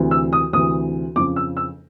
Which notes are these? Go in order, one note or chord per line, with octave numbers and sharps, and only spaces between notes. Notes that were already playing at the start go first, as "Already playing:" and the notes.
Already playing: D2 C3 E3
E6
D#6
D2 C3 E3 D#6
F2 C#3 F3 D6
E6
E6